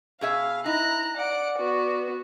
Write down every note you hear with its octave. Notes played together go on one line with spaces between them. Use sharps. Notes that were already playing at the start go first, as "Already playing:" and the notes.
B2 G#4 E5 F5
D#4 E4 A#5 F#6
D5 F#5 D7
B3 F#4